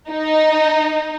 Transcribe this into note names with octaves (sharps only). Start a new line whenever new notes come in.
D#4